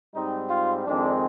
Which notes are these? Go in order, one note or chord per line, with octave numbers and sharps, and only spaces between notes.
G#2 G3 C4 D#4
F4
F2 D#3 G#3 C4 D4